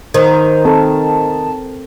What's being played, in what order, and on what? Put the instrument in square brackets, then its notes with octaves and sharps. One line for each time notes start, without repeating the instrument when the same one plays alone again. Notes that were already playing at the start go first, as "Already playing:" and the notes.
[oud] D#3 [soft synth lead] C5
[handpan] C4 A4 A#4 [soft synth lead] A5